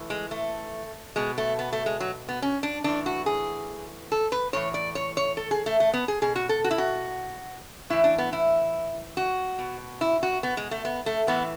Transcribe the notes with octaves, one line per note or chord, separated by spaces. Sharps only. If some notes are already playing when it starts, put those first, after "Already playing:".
Already playing: A2 E3
G#3
A3
B2 G#3
A3
B3
A3
G#3
F#3
B3
C#4
D4
A2 E3 D4
F#4
G#4
A4
B4
A2 E3 C#5
D5
C#5
C#5
A4
G#4
A3
A3
B3
G#4
B2 G#4
F#4
A4
F#4
E4
F#4
A2 E3 E4
D4
B3
E4
F#4
B2
E4
F#4
B3
G#3
A3
B3
A3
A2 E3 B3